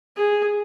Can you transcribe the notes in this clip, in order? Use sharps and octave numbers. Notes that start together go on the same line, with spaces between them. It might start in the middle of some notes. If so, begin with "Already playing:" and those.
G#4